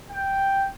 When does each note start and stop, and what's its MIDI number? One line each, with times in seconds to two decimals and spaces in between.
0.10 0.67 79